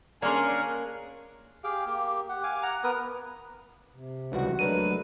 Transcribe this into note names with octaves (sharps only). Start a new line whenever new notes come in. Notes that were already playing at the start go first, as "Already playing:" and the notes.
A#3 C#4 D4 G#4 A#4 D5 C6 C#6
G4 G#4 F5 G5
A#3 G4
G4 F#5
F5 G#5 D6
F#5 A#5
B3 A#4 B4 D#6
C3
C#2 E3 G3 F#4
F#3 G#3 A3 D4 A#4 B4 D#7